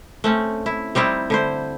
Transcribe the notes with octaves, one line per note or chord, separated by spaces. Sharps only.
A3 C4 C#4
E4
G3 C4 D#4 E4
D3 E4 C5